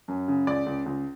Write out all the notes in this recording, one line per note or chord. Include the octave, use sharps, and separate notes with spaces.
F#2
C#3
C#2 D5
C#2
C#2